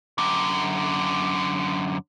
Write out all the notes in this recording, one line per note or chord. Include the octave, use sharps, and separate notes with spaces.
F#2 D3